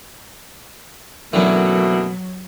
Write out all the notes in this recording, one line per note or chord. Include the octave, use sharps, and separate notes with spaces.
F#2 B2 D3 E3 F#3 A3 A#3